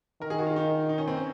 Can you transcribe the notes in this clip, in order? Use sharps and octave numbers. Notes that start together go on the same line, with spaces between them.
D#3 A#4
G#4
F#4
F4
D#4
D#4
C#4
C4
C#4